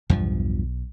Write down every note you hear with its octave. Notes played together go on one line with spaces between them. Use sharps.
B1 E2 G2 F3